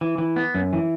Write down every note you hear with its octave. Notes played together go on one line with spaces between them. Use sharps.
E3
E3
B3
F#2
E3